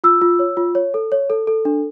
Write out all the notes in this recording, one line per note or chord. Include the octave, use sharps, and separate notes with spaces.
F4 E6
F4
C#5
F4
C#5
A4
C#5
A4
A4
D4